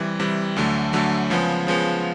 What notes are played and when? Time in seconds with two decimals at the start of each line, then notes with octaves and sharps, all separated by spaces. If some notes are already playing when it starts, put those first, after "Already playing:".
Already playing: C3 E3 G3
0.20 C3 E3 G3
0.56 D2 D3 F#3 A3
0.93 D2 D3 F#3 A3
1.30 C#3 F3 G#3 B3
1.67 C#3 F3 G#3 B3